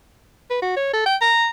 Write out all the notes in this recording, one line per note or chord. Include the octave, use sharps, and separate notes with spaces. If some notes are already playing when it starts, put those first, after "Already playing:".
B4
F#4
C#5
A4
G5
A#5